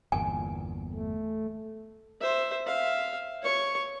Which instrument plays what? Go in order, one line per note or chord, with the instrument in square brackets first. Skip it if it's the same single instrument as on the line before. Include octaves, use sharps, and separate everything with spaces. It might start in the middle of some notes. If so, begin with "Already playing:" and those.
[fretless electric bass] G1 E2 A#2 [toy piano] G#5
[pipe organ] A3
[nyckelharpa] C5 E5
E5 F5
C#5 C#6